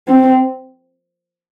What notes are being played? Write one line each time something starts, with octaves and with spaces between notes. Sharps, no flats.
C4